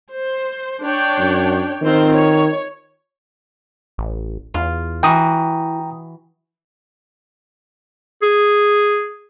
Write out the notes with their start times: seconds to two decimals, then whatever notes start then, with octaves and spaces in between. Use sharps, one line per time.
0.12 C5
0.83 D4 C#5 G5
1.19 F#2
1.82 D#3 C4 F4 C5
2.15 C#5
3.98 A1
4.54 E2 F4
5.03 E3 E4 F#4 G5 A#5 D#6
8.22 G#4